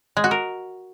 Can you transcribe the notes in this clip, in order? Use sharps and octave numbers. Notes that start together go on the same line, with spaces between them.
G#3
F#4
A#4